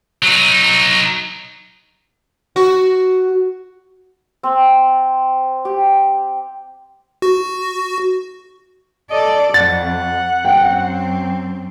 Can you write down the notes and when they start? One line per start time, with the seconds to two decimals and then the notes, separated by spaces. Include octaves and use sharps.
0.23 F#3 D#4
2.56 F#4
4.43 C4
5.65 G4
7.22 F#4
9.10 A4 D5 D#5
9.54 F2 F#5 A6
10.45 F#2 C4 G5